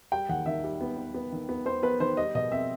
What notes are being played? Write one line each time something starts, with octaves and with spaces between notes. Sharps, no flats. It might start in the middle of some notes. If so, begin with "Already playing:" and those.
G3 G5
D#2 F#5
D#3 E5
G3
B3
B3
B3
D#3
B3
B3 C5
B3 B4
D#3 C5
G3 D#5
B2 D#5
C4 E5